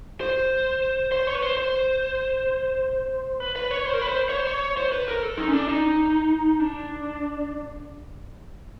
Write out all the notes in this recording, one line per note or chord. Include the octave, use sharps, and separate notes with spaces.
C5
C5
C#5
B4
C5
C5
B4
B4
C#5
C5
A#4
B4
C5
C#5
C5
C#5
C5
B4
A#4
A4
D#4
C#4
D4
D#4
D4